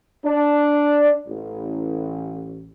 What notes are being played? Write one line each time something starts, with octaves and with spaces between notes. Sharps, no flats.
D4
A1